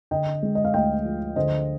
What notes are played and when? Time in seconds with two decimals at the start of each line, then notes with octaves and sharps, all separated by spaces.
0.11 D3 D#5 G5
0.42 G#3
0.55 D#5
0.64 F5
0.74 D2 D#5 G5
1.05 F3
1.36 D3 C5 D#5